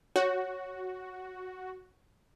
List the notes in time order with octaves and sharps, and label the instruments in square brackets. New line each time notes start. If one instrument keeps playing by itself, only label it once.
[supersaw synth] F#4 [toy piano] C#5